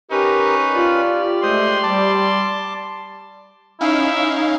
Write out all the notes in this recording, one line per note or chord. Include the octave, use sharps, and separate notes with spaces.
C#4 D#4 G4 A#4 B4
F4 G4 D5
G#3 A3 C5 C6 D#6
G3 A5 D6
C#4 D#4 E4 F5